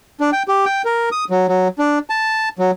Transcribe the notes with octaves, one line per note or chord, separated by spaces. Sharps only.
D4
G5
G4
G5
A#4
D#6
F#3
F#3
D4
A5
F#3